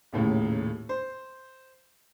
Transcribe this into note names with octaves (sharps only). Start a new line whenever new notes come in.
D#1 D#2 A2 C#3
C5